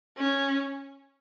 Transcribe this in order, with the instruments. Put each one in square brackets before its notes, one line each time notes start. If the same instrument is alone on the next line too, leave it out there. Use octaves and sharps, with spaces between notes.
[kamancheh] C#4